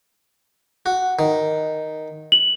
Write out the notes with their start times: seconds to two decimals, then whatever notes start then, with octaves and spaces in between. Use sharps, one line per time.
0.86 F#4
1.19 D#3
2.32 F#7